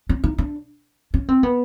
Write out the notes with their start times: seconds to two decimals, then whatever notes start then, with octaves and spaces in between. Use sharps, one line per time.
0.09 C#4
0.24 D#4
0.38 D4
1.14 C#4
1.29 C4
1.43 B3